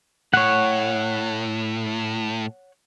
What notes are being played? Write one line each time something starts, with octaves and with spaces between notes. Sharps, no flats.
A2 C#5 F#5